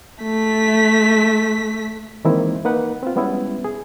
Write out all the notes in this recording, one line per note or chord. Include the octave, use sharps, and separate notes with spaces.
A3 B6
D#3 E3 G#3 A#3 C4 E4
A#3 D#4 B4 F#5
C4 F4
G3 G#3 B3 C#4 E4
G#4